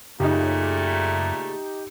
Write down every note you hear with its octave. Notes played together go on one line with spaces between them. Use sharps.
F#2 A#2 C#3 A3 D#4 G4